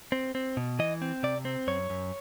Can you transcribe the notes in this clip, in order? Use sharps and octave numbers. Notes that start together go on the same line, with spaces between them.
C4
C4
B2
E3 D#5
C4
C3 D5
C4
F#2 C#5
F#2